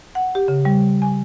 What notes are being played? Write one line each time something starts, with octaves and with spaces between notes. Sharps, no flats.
F#5
G4
C#3
G3
G#5